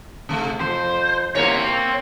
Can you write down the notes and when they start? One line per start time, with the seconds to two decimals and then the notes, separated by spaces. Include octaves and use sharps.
0.29 C3 A3
0.60 F2 C5
1.35 E2 C3 A#3 C#5
1.60 C4